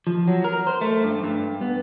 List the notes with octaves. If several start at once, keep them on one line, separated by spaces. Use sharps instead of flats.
F3
F#3
A#4
C5
A3
G2
G2
B3